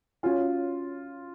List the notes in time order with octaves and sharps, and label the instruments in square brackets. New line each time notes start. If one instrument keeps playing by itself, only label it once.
[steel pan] C#4 F#4 C#5 G#5 [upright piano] F4